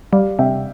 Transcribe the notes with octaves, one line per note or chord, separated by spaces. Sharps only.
G3 D5 F5
C3 E5 G5